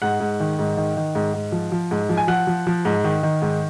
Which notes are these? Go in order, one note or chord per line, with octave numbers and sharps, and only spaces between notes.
G#2 F#5
G#2
D#3
G#2
D#3
D#3
G#2
G#2
F3
F3
G#2
F3
G#5
F3 F#5
F3
F3
G#2
D#3
D#3
G#2